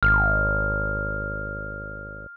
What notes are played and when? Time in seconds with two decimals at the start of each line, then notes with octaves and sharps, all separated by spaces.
0.03 G#1 F6